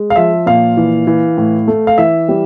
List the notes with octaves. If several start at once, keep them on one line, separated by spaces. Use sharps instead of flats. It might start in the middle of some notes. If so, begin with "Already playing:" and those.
Already playing: G#3
F5
F3 E5
A#2 F5
E3
E3
A2
A3
F5
E3 E5
G3